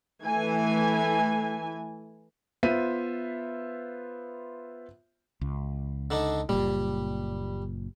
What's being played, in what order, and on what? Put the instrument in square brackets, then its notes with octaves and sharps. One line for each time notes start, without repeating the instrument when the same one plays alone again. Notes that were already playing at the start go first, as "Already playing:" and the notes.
[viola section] E3 A3 G#5
[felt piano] B3 F4 C5 E5 B6 D#7
[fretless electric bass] C#2
[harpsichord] D3 D4 D#4
[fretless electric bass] F#1 A#2 [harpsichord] G3